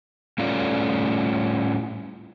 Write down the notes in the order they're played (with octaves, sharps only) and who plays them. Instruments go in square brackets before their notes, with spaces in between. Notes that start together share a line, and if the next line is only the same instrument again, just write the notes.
[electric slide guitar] A2 G3 A3 C#4 F4 D5